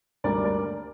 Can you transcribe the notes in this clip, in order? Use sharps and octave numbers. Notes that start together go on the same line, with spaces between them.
D2 D3 G3 A#3 A#4 D5
A#4 D5